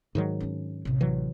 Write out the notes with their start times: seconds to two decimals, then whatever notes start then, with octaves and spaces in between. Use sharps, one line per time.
0.15 G#2 D#3 F#3
0.40 C#4 D4
0.85 A1 C3
1.01 E3 F#3